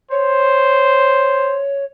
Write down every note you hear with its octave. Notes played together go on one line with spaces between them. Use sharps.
C5 C#5